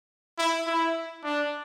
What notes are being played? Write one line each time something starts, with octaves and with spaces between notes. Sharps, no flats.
E4
E4
D4